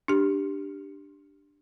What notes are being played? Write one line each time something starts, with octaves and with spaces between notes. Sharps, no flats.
D4 G4